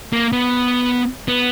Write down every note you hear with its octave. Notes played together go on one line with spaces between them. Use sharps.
A#3
B3
B3